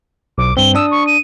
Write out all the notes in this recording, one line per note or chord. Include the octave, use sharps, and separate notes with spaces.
B1 D6
G2 C4 G7
D4 D#6 E6
C#6
D#7